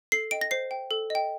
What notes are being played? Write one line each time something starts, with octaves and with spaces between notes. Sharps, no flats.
A4 C7
D#5 G5 D7
A#6
C5 C7
G5
A4
D#5 G5